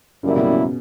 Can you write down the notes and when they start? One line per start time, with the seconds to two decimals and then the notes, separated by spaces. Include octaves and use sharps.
0.23 F#2 C#3 E3 G3 A#3 E4
0.36 B2
0.50 C#3